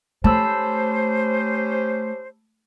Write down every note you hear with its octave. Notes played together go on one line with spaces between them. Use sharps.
A3 C#4 G4 C5 A5 B5 E6